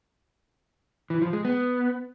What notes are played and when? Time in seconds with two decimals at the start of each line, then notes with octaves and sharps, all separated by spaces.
1.10 E3
1.22 F3
1.33 G#3
1.45 B3